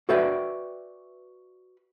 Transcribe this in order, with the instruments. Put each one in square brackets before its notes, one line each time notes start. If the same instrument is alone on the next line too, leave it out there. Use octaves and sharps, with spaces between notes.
[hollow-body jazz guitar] F#4 A4 B4 D5 E5 G5